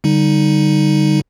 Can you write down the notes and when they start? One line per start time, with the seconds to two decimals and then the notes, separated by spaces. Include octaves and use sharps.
0.04 D3 G3 D#4